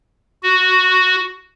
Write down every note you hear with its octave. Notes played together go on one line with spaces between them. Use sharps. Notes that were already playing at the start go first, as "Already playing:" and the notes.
F#4